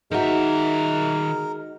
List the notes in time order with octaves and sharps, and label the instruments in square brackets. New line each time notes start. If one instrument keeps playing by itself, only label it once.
[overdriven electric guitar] D#3 E5 [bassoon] G#3 [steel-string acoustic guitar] D#4 F#4 [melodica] A#4